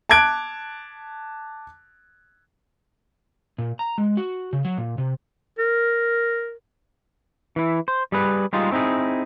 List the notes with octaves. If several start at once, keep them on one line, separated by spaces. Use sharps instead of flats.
A5 D6 F#6 G#6 D7
A#2
A#5
G#3
F#4
C#3
F#3
A#2
C3
A#4
E3 E4
C5
G3 G#4 B4
G3 G#3 D#4 F4
A3 C4 D#4 E4 G#4